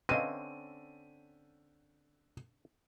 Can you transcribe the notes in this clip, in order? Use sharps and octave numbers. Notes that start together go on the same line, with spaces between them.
D3 C4 C#4 B4 D#5 F5 D#7